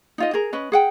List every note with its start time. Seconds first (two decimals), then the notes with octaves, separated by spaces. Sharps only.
0.18 D#4 F4 D#5
0.34 G#4 A#4
0.53 C#4 B4 D#5
0.72 G#4 F#5 G5